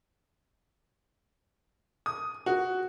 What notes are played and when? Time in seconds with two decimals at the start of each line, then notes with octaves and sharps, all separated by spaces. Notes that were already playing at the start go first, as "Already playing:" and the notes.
2.06 D#6
2.46 F#4